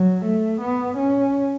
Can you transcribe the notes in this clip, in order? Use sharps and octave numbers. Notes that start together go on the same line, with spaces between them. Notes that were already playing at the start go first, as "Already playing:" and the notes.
Already playing: F#3
A3
B3
C#4